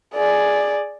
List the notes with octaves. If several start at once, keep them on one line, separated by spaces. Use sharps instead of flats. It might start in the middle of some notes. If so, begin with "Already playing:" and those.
G#4 D5